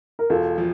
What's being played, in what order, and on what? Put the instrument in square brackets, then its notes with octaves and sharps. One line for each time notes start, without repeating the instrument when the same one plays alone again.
[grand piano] A#4
[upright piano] E1 [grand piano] F4 A4
[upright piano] F3